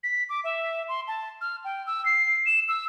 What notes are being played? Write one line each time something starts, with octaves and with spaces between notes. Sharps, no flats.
B6
D6
E5
C6
A5
F6
G5
E6
C7
E7
E6